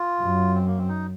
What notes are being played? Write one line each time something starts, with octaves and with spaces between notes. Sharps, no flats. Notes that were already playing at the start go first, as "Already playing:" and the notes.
Already playing: F4
F#2
C4
A#3
C4
D#4